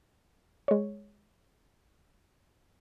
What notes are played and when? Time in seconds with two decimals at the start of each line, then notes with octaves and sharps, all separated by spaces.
0.68 G#3 C#5